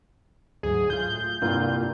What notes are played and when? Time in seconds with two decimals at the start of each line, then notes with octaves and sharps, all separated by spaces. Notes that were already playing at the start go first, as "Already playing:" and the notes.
0.63 D2 G#2 F#3 G#4
0.90 A2 F4 G6
1.42 C2 G2 A#3 F4